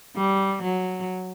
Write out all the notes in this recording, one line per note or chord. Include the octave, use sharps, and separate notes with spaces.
G3
F#3